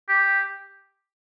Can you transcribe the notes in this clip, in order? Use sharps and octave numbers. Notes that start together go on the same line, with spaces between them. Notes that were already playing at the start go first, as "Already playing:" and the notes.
G4